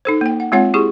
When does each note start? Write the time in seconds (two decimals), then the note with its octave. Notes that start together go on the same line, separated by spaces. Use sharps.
0.05 D#4 A4 C5
0.21 A#3 G5
0.40 F#5
0.52 G#3 C4 F4 C#5 F#5
0.74 E4 G4 G#4 C#6